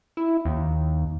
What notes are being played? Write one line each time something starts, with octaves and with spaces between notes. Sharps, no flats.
E4
D#2